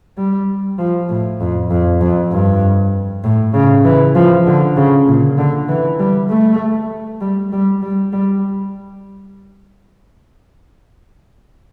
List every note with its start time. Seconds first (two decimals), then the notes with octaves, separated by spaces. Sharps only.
0.18 G3
0.79 F3
1.09 A2
1.40 F2
1.70 F2
2.01 F2
2.32 G2
3.24 A2
3.53 C#3
3.84 E3
4.15 F3
4.47 D3
4.76 C#3
5.07 A#2
5.38 D3
5.69 E3
5.99 G3
6.30 A3
7.21 G3
7.53 G3
7.82 G3
8.13 G3